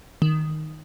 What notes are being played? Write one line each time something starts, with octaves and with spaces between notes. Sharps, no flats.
D#3